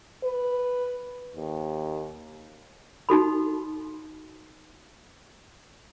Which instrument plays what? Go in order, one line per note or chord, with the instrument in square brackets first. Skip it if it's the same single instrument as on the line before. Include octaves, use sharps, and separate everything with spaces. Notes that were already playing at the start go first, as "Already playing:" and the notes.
[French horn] B4
D#2
[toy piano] D#4 F#4 A4 B5